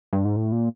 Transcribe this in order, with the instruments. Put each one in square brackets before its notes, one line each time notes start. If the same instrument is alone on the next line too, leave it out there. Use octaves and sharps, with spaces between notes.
[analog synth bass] G2
G#2
A2
A#2